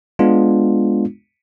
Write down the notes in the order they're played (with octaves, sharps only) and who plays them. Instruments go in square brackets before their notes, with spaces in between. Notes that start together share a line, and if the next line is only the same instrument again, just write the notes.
[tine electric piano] G#3 B3 D4 F4